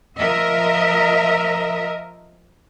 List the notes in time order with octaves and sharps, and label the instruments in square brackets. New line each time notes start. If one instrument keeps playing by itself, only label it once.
[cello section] F3 A#4 D#5 E5